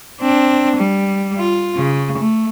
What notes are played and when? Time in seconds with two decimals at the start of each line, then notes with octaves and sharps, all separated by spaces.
0.21 C4 D4
0.77 G3
1.38 F4
1.77 C#3
2.18 A3